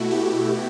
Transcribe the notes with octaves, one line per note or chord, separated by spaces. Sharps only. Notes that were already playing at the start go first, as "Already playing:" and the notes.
Already playing: B2 A3 E4 F#4
G4